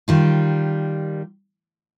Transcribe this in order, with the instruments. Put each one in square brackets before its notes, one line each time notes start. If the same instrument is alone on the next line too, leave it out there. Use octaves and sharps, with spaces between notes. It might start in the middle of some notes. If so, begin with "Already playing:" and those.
[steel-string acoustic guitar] D#3 G3 F4